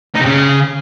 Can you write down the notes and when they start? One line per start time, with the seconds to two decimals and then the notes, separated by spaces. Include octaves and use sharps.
0.15 D#4
0.20 C3
0.26 C#3